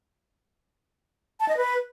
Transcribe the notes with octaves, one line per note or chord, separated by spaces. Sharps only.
A5
D#5
B4